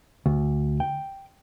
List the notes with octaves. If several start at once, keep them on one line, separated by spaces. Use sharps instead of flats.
D2
G5